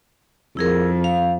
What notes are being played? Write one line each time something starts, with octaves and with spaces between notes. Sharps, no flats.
F2 E4 G#4 A#4
F5